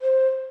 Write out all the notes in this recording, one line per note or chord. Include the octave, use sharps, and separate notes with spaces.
C5